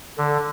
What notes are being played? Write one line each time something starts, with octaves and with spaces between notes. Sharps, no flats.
D3